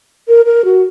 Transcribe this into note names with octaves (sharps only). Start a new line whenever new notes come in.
A#4
A#4
F#4